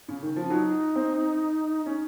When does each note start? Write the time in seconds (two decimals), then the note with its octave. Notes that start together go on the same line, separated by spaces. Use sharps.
0.08 C#3
0.22 D#3
0.36 F3
0.45 C#4
0.50 F#3 D#4
0.95 C4
1.86 C#4 D#4